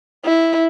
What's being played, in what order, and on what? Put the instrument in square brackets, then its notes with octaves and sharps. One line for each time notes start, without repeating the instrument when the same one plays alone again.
[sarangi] E4